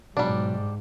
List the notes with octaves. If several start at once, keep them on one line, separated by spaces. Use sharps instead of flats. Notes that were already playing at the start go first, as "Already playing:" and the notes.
G#2 B2 F#3 G3 D4